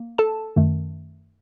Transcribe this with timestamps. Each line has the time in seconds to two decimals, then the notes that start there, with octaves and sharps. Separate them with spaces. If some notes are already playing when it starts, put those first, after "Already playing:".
Already playing: A#3
0.18 A4 A5
0.56 F#2 D#3 A3